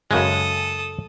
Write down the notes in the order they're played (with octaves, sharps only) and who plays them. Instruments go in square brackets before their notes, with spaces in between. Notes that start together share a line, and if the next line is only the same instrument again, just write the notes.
[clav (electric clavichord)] F#2 C#3 G#3 [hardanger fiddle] A4 D#6